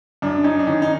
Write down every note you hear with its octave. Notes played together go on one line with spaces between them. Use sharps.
F#2 D4
C#4 D#4
D4
D#3 C#4 D#4
D#4